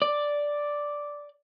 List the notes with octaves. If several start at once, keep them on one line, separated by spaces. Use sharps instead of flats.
D5